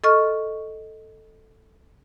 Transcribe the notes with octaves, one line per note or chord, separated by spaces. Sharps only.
A4 D#5 C#6 F6